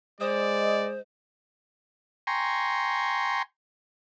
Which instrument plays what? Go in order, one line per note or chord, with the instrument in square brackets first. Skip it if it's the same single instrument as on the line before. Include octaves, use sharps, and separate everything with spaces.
[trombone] G#3 [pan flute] C5 [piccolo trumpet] D5 [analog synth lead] D#5
[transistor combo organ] G5 G#5 A#5 C6 C#6